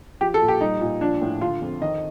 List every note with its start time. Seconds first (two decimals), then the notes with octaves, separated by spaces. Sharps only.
0.21 F3 G4
0.34 A4
0.42 A#2
0.48 G4
0.61 G3 D#4
0.81 A#2
1.01 F3 D4
1.22 A2
1.41 D3 F4
1.62 F2
1.81 D#3 D#5